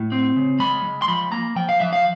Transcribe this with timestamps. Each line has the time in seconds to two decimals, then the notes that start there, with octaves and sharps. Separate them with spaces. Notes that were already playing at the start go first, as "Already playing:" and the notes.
Already playing: A2
0.12 C4
0.36 C#3
0.59 G#3 B5
0.84 G#3
1.02 C6
1.08 F3 B5
1.32 A#3 A#5
1.56 F3 G5
1.69 F5
1.80 F3 E5
1.93 F5